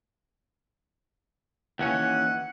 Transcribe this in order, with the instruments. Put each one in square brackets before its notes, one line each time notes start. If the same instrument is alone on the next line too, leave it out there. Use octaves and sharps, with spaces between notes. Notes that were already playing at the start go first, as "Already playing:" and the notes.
[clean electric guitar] D#2 E3 C#4 [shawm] F#5